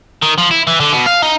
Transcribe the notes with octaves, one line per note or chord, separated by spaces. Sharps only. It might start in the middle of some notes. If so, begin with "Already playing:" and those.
D#3
F3
E4
E3
D3
B2
F5
D#4